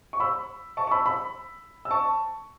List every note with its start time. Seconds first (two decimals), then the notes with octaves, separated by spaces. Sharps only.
0.13 C#6
0.20 B5 E6
0.77 A5 C#6
0.87 C#6
0.91 B5 E6
1.06 B5 E6
1.85 E6
1.91 A5 C#6